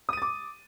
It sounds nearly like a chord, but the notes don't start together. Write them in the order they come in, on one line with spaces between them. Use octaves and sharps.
D#6 D#7 A6 D6